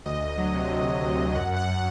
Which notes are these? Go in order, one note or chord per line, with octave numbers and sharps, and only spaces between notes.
D2 D#5
D2
F#3
C3
D2
D2
D2
C3
F#2 F#5
F#2 F#5